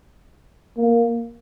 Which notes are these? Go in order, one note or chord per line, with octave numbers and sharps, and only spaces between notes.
A#3